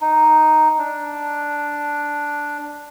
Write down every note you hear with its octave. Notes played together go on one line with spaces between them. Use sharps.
D#4
D4